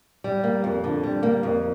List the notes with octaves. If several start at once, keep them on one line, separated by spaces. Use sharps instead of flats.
G3
A#3
F2
D3
G3
A#3
F2